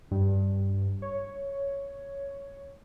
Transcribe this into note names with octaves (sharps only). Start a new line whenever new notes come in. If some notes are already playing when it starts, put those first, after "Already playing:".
G2
C#5